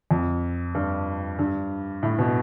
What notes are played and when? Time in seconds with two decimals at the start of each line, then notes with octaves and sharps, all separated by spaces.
0.11 F2
0.75 G2
1.39 G2
2.03 A2
2.19 B2